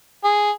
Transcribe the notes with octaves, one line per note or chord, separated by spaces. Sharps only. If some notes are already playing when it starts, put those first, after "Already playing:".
G#4